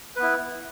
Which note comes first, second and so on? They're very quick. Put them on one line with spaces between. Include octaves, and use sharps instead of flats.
B4 B3 E4